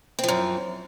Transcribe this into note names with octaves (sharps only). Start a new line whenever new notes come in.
F#2 F3 C4